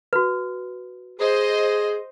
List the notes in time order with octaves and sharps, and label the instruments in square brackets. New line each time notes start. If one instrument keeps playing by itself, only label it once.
[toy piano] F#4 B4
[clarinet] G#4 [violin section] C5 D#5